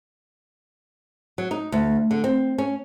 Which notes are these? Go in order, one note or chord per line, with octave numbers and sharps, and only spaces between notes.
F#3
D#4
D2
D3
C4
C#4